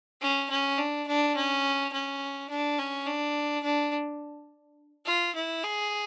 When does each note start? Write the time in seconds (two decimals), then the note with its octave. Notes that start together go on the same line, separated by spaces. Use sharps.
0.21 C#4
0.50 C#4
0.78 D4
1.08 D4
1.36 C#4
1.92 C#4
2.50 D4
2.79 C#4
3.06 D4
3.63 D4
5.06 F4
5.35 E4
5.64 G#4